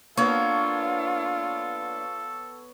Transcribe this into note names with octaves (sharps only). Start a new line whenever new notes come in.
A#3 B3 D4 F4 A4 C#5